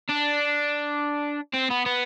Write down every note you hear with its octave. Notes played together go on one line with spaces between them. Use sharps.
D4
C4
B3
B3